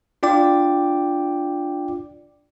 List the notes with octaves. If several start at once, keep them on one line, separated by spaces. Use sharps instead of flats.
D4 F4 D5 G5 D6